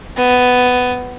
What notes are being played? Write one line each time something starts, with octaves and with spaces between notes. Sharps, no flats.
B3